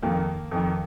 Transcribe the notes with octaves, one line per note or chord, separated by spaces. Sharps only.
F2 D#3 A#3
F2 D#3